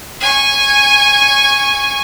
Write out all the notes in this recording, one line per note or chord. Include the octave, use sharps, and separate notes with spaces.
G#5 C#6